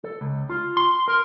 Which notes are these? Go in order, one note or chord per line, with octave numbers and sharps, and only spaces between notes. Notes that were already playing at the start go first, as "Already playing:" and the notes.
A4
C#2
F4
C6
A#4